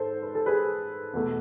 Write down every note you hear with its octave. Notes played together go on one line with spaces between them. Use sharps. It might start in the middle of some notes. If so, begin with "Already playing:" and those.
Already playing: G#2 A4 C5
B4
A4
G#4 B4
E2 B2 A3